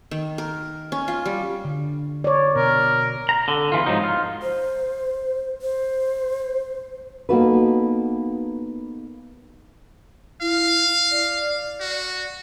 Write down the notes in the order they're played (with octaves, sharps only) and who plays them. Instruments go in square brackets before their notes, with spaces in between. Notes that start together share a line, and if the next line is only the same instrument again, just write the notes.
[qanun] D#3
A#4
C#4
F4
G3
[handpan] D3
C#5 D5
[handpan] B2 [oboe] A#4
[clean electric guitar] A#5
D3
E2 E3 F4
G#2 C3 F3 F#3 D#4
F4
[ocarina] C5
C5
[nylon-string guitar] A#3 B3 D#4 F#4 A4 B4
[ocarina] E4 [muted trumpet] F5
[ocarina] D5
[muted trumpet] F#4